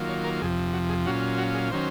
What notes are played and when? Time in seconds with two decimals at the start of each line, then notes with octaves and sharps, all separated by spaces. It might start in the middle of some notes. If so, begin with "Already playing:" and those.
Already playing: D#3 F#3 A#3 F4
0.09 C#5
0.25 A#4
0.42 F2 C3 F3 G#4
0.73 F#4
0.90 G#4
1.06 A#2 F#3 C#4 F4 F#4
1.38 F#4
1.54 G#4
1.71 D#3 F#3 C#4 C5